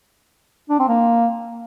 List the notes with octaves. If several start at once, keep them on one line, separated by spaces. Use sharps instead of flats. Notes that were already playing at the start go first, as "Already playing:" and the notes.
D4
C4
A#3